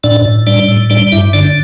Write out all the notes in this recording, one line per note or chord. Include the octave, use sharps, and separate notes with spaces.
A2 D4 D5
A2
G3 D4 D5
A2
G3 D4 D5
G2 E4 E5
D3 D4 D5